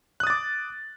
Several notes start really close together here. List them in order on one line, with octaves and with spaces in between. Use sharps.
F#6 D#6 A6 D6